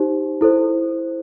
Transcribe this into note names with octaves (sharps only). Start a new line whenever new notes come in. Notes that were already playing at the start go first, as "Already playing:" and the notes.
Already playing: D#4 G4 C5
E4 A4 C5